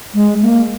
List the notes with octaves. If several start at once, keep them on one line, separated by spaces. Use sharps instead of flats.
G#3
A#3